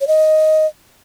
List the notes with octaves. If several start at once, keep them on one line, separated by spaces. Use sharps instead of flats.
C#5
D#5